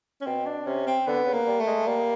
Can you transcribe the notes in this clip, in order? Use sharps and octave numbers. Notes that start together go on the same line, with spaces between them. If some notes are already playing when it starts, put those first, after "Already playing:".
C#4
B2 C4
D4
C3 C#4
C4
D3 B3
C#3
A#3
G3
A3
G#3
G3 A#3